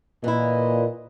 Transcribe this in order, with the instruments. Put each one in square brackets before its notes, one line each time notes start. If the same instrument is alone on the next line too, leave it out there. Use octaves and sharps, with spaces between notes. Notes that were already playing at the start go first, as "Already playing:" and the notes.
[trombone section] A#2 [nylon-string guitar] E3 E4 [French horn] D#5